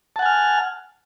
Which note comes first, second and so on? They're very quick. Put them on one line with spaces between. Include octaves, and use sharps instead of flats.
A5 F#5 G#5 F6